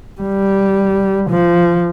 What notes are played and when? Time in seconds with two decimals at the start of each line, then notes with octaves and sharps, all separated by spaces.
0.21 G3
1.30 F3